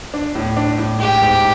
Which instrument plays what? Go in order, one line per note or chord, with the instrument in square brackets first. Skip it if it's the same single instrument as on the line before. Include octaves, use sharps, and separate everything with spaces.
[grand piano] D4
A2
D4
A2
[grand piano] G#3 [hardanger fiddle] G4
[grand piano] G#2